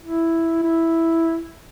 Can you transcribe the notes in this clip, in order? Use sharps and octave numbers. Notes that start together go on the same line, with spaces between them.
E4
E4